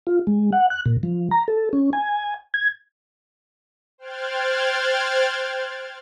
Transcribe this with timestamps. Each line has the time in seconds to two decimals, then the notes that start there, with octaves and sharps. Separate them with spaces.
0.07 F4
0.27 G#3
0.52 F#5
0.70 F#6
0.86 A#2
1.03 F3
1.31 A#5
1.48 A4
1.73 C#4
1.93 G#5
2.54 G#6
3.98 C5 G5 F6 F#6 G#6 A6